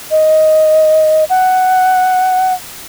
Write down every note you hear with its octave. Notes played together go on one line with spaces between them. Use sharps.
D#5
F#5